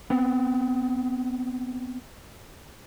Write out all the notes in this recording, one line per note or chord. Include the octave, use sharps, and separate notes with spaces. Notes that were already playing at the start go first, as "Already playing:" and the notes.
B3 C4